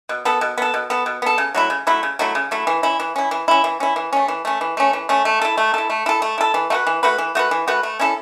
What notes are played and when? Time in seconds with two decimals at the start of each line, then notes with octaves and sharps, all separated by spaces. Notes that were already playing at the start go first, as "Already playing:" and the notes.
0.09 B2
0.25 B3 A4
0.41 B2
0.58 B3 A4
0.74 B2
0.90 B3 A4
1.06 B2
1.22 B3 A4
1.38 C#3
1.54 F#3 A3 E4
1.70 C#3
1.87 F#3 A3 E4
2.03 C#3
2.19 F#3 A3 E4
2.35 C#3
2.51 F#3 A3 E4
2.67 E3
2.83 C#4 E4
3.00 E3
3.16 C#4 E4
3.31 E3
3.48 C#4 E4
3.64 E3
3.80 C#4 E4
3.96 E3
4.13 A3 C#4
4.28 E3
4.45 A3 C#4
4.61 E3
4.77 A3 C#4
4.93 E3
5.09 A3 C#4
5.25 A3
5.42 E4 A4
5.58 A3
5.74 E4 A4
5.90 A3
6.06 E4 A4
6.22 A3
6.38 E4 A4
6.54 E3
6.70 A3 F#4 B4
6.87 E3
7.03 A3 F#4 B4
7.18 E3
7.35 A3 F#4 B4
7.51 E3
7.68 A3 F#4 B4
7.83 A3
7.99 C#4 E4 A4